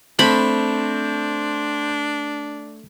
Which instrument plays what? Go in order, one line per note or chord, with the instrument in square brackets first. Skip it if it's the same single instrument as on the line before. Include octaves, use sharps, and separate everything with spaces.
[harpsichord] A3 [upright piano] C4 [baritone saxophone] D4 [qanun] B5